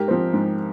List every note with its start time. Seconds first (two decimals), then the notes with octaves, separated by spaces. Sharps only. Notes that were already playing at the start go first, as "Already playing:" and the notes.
Already playing: G#2 G4 A#4
0.08 F3 C4
0.33 G#2